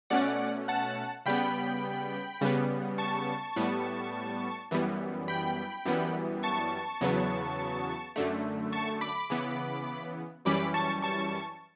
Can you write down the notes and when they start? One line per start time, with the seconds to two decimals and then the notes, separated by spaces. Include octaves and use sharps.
0.10 B2 A3 C#4 D5 F#5
0.68 F#5 A5
1.26 C#3 G3 B3 G5 B5
2.41 C#3 G3 B3
2.98 A5 C#6
3.56 A2 G3 B3
4.71 F#2 E3 G3 B3
5.28 G5 B5
5.86 F#2 E3 G3 B3
6.43 A5 C#6
7.01 E2 C#3 F#3 B3
8.16 F#2 D3 A3
8.73 A5 C#6
9.01 B5 D6
9.30 C#3 E3 B3
10.45 F#2 E3 G3 C#4 B5 D6
10.74 A5 C#6
11.02 A5 C#6